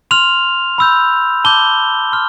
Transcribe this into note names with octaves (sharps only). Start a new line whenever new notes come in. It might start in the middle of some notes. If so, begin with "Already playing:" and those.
C6 F6 F7
B5 E6 G6
A5 D6 G6 G7
C6 F6